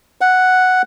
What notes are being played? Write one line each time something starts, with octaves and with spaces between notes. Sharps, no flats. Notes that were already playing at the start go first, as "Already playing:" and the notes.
F#5